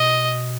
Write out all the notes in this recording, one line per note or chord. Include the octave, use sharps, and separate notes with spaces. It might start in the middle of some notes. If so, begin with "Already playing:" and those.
Already playing: B2 D#5